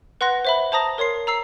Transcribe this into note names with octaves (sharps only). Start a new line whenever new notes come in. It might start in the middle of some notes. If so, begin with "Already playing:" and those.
B4 F#5 C6 F#6 A#6
C5 E5 B5
C5 A5 A#5 D#6 A#6
A#4 C#5 C6 C7
A#5 E6 C7